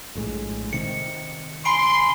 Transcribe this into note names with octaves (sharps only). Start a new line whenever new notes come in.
A#1 A2 G#3
C3 D#3 C#7
G#5 B5 C6 D7